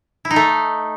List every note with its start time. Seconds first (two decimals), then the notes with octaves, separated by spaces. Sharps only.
0.25 E4
0.31 D#4
0.36 A3